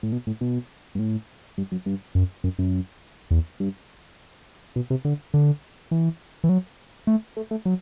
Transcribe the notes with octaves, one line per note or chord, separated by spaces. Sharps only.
A2
B2
A2
B2
G2
A2
G2
F#2
G2
F#2
F#2
F#2
E2
G2
B2
C3
D3
D3
E3
E3
F#3
A3
A3
A3
F#3